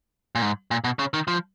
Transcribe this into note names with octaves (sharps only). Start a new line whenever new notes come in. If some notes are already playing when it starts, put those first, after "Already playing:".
A#2
G#2
A#2
B2
C#3
D#3
F3